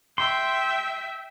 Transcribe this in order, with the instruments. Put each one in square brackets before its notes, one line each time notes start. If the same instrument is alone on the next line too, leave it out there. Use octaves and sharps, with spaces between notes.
[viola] E5 G5 [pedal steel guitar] C6